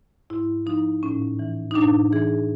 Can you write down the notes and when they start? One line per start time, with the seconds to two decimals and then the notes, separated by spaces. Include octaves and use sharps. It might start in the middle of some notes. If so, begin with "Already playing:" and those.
0.30 G#2 E4
0.66 F3 D#4
1.03 A2 C#4
1.39 E3
1.71 D#4
1.75 A2 D4
2.13 E3 G#4